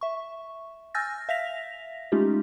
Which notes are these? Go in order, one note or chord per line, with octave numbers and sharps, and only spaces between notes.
E5 C#6
G#5 E6 F6 G6 A6 A#6
E5 F5 A#6 B6 F7
G#3 A3 C#4 D#4 F4 G4